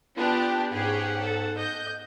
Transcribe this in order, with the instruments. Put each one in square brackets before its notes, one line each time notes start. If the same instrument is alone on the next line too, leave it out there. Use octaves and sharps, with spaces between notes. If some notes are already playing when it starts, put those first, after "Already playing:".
[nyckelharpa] B3 [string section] D4 G4 [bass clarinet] F4
[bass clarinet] G#2 [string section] C#4 G4 G#4 [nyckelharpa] F#5
[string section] A4
[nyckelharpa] D#5 [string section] G6